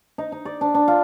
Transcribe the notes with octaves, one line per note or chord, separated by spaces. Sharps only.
D#4
D#4
D5
D4
D4
F4